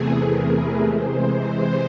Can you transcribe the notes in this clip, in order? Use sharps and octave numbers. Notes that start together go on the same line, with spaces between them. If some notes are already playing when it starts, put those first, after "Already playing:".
Already playing: E2 C3 E3 A3 G#4
A#4
B4
C3 E3 G#3 C5